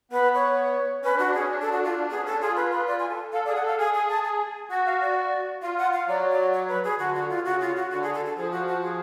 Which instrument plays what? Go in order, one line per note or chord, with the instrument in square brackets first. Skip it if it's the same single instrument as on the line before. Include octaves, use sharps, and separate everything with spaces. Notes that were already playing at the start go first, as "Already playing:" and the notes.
[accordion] B3 [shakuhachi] B4
[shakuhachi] C#5
[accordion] C#4 [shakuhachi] B4
[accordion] D4
[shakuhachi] F#4
[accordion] D4
[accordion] C#4 [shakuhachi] G#4
[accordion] D4
[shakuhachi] A4
F#4
F4
[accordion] B3 [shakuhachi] G#4
[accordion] C#4 [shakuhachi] A4
[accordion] D4
[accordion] F4 [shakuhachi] G#4
[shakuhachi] B4
B4
D5
G#5
A4
[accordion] A4 [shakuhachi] F5
[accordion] G#4 [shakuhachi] D5
[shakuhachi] F#5
[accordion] A4 [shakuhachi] F5
[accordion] G#4 [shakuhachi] G#5
[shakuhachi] G#5
A5
A5
G#5
[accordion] F#4 [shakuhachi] F#5
[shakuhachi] F5
D5
[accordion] F4 [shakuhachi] F5
[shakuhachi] F#5
F5
[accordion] F#3 [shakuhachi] D5
[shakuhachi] D5
C#5
B4
G#4
[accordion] D3 [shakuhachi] F#4
[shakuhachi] F#4
F4
[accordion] C#3 [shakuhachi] F#4
[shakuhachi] F4
F#4
[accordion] D3 [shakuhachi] F#4
[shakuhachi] G#4
A4
A4
[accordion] F3 [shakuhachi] G#4
[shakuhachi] F#4
F#4
G#4